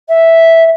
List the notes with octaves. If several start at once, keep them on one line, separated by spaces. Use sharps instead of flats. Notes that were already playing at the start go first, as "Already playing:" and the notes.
E5